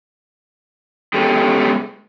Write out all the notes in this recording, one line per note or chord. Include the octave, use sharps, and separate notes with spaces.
G#3 B3 C#4 G4 A4